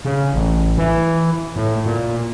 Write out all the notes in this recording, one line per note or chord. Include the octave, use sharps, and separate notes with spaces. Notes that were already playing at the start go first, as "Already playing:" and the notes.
C#3
A1
E3
A2
A#2